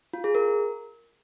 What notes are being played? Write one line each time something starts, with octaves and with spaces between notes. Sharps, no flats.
F4
G#4
A#4